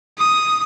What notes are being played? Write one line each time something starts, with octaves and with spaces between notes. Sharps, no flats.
D#6